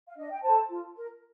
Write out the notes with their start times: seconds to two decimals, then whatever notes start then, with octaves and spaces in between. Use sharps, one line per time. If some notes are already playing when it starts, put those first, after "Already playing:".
0.08 F5
0.17 D4 D#5
0.32 G5
0.43 A4 C5 A5
0.69 F4
0.96 A#4